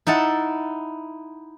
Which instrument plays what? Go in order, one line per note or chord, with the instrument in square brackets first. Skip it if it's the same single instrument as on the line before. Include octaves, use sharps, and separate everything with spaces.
[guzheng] D#4 E4 F#5 A5